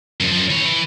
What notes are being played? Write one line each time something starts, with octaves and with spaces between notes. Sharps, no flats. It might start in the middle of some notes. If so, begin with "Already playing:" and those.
F#2 F3
F#2 F3
E3 C#5
E3